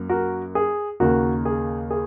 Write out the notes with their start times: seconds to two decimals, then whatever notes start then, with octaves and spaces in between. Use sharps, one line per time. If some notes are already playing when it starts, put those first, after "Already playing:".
Already playing: F#2 A#3
0.09 F#4 A#4
0.55 G#4
1.00 D#2 C#3 A#3 F#4
1.45 G#4
1.91 G#4